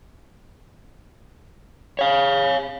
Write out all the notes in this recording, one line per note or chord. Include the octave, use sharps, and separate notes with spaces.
C#5 F5